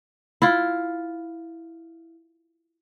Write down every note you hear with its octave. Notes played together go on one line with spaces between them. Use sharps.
E4 F4